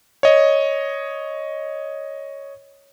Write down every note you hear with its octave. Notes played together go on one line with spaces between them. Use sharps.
C#5 D#5